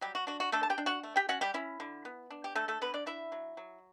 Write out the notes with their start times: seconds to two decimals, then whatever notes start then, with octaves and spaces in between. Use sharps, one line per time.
0.01 F#3 G3 G4
0.15 F#4
0.27 D4 F#4
0.40 F#4
0.52 A3 D4 A4
0.63 A5
0.70 G4 G5
0.78 D4
0.86 F#4 F#5
1.03 A3
1.16 G4 G5
1.29 C#4 F#4 F#5
1.41 G3 G4
1.54 C#4 E4
1.80 D3
2.05 B3
2.31 D4
2.44 G4
2.55 D3 A3 A4
2.68 A3 A4
2.81 D3 B3 B4
2.94 D4 D5
3.06 D4 E4 E5
3.32 F#3
3.57 F#3